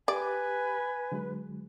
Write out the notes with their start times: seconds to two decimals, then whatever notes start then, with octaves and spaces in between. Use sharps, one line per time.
0.08 G4 B4 D5 G#5
1.12 D3 F#3 G#3